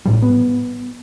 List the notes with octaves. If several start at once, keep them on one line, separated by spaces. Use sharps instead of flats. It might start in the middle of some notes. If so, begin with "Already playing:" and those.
A1 A2 G3
B3